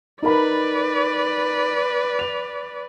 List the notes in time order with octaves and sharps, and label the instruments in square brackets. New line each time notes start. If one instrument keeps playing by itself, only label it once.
[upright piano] D#4 A#4 B5 [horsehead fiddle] B4 D5
[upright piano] F7